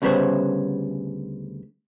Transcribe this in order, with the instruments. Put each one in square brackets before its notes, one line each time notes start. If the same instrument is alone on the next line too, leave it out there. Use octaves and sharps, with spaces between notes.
[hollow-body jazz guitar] D2 C#3 G3 B3 C5 C#5